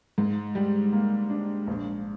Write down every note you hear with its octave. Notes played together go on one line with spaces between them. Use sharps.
G#2
G3
A#3
D4
A#1